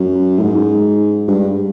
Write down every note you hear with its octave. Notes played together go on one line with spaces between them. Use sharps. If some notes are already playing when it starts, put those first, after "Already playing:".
Already playing: F#2
A2
G#2
G2